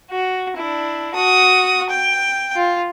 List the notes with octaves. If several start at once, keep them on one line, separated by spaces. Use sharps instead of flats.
F#4
D4 E4
F#4 D#6
G5
F4